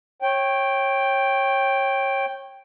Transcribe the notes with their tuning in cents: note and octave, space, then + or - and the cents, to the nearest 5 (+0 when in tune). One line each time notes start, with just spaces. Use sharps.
C#5 -25 G5 +0